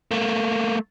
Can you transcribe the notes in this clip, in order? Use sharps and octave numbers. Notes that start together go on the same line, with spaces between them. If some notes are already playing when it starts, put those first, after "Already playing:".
A3 A#3